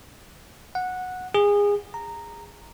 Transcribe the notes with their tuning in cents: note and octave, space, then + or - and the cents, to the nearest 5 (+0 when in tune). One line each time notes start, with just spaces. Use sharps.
F#5 -10
G#4 -25
A#5 -10